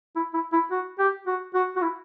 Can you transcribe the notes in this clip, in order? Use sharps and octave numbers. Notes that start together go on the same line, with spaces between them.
E4
E4
E4
F#4
G4
F#4
F#4
F#4
E4